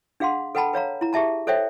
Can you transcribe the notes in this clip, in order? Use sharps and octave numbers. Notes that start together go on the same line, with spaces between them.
D4 G#4 F5 F#5 C6
A4 B4 F#5 G5 A5 B5
B4 C#5 F5 A#5
E4 A#5
G4 G#4 E5 A5 A#5
A4 C5 C#5 E5 G5